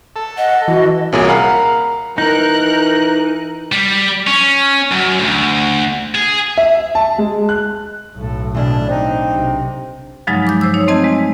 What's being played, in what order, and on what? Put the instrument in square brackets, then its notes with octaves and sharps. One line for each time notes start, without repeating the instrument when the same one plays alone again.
[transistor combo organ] A4
[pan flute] D#5 [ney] F#5
[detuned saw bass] E3 [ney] F#4
[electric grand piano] C2 A#2 G#4 [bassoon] F#2
[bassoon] A#4 [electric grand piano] F5 F#5 B5
[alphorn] E3 [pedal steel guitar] D#4 [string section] A#4 F#6
[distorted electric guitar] G3
C#4
F#2
D2
G#4
[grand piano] E5
A5
G#3
F#6
[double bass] B1 A2 [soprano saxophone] A4
[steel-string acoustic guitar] B2 D3 E3 [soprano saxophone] D4
[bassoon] C4 [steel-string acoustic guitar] D4 [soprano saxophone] D#4
[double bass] B1 C3
[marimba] G2 C#3 F3 F#3 G#3 D#4
D6 G6
C5 E6
D#4 C#5
A3 C4 D#5 A5 G#6
G#3